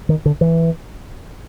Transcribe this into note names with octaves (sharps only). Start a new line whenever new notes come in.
D#3
D3
E3